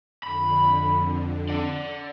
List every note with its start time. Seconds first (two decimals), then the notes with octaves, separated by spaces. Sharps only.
0.23 F2 D3 B5
1.49 D5 F#5